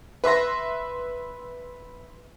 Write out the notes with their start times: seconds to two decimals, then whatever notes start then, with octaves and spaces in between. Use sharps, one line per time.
0.24 B4 E5 C6 A#6